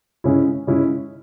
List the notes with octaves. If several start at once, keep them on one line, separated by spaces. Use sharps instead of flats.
C#3 G#3 C#4 E4
C#3 G#3 C#4 E4